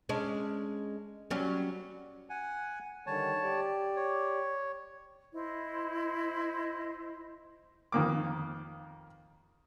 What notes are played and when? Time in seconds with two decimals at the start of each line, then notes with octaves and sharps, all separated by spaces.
0.09 G#3 C#4 D4
1.31 F#3 G3 C#4
2.30 F#5 G#5
3.07 D3 D#3 G3 C#5 A5
3.43 G4 D5
3.96 C#5
5.33 E4 C5 D#5
7.92 F2 D#3 A#3 D6